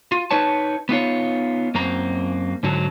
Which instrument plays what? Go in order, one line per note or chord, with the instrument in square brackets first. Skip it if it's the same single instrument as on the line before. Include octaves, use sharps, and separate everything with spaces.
[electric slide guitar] F4
D#4 B4 C#5 A5
B3 D#4 F4 C#5
F#2 A#3 C4 A#5
G#2 D3 F#3